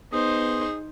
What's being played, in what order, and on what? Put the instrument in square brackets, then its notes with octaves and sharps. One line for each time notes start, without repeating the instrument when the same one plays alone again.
[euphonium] B3 [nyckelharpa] D#4 C5 [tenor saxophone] G#4